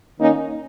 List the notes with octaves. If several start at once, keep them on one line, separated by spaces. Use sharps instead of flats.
D#3 A#3 C#4 D#4